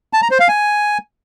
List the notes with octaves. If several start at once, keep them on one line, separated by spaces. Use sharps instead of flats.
A5
A#5
C5
F5
G#5